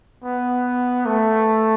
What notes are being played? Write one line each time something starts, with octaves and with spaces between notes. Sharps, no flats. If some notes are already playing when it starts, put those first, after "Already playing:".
B3
A3